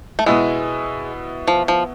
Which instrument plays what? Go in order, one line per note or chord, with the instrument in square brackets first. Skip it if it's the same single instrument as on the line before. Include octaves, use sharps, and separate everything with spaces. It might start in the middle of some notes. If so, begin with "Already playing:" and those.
[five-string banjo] A3
[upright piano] B2 B3 E4 [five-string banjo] G#3
[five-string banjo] F3
F3